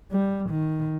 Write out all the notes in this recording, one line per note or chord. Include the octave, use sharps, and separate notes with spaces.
G3
D#3